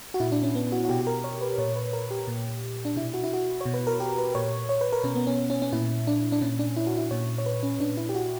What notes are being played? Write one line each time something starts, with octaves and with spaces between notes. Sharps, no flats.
F#4
A#2 E4
D4
C#4
B3
F#4
F#4
B2 G4
G4
A#4
C#5
B4
A#2 C#5
B4
A#4
G4
A#2
D4
B2 E4
F#4
E4
F#4
B2 C#5
B4
A#4
G4
B4
A#2 C#5
C#5
B4
A#4
B2 C#4
B3
C#4
C#4
C#4
A#2 E4
D4
D4
A#2 C#4
D4
E4
F#4
E4
A#2 C#5
C#5
B4
C#4
A#2 D4
E4
G4
F#4